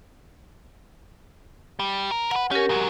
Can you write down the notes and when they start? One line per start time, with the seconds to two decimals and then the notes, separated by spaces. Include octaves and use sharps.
1.79 G3
2.11 A#4
2.31 A#4 B4 F#5
2.51 C#4 G4 A#4
2.69 G#2 F#3